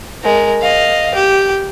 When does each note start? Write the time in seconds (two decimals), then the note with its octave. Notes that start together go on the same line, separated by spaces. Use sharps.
0.23 G#3 A#4
0.62 D#5 F5
1.14 G4